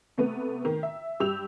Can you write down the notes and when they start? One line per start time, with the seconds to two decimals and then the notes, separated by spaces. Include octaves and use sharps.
0.17 C3 A3 B3 B4
0.65 D#3
0.83 E5
1.20 G2 G4 E6 F7